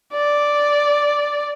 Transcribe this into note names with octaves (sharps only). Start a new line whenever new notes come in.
D5